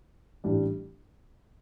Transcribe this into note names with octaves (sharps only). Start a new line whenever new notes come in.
A1 A2 G3 D4